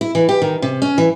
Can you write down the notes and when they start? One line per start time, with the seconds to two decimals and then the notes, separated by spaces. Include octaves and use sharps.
0.01 E4
0.15 E3
0.29 G4
0.42 D#3
0.62 C3
0.82 C#4
0.98 E3